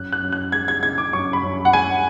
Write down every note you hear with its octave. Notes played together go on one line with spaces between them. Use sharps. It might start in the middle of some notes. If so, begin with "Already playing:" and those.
Already playing: F#2 F#6
F#6
F#2
F#6
G#3 G#6
G#6
C#3 G#6
D6
F#2 C#6
B5
F#2
F#5
G#3 G#5